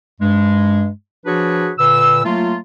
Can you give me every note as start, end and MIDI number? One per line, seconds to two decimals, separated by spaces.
0.21 0.89 43
0.21 0.89 56
1.26 1.71 53
1.26 1.71 62
1.26 1.71 66
1.26 1.71 68
1.26 1.71 71
1.26 1.71 73
1.79 2.23 46
1.79 2.23 50
1.79 2.23 71
1.79 2.23 88
2.25 2.57 54
2.25 2.57 57
2.25 2.57 58
2.25 2.57 65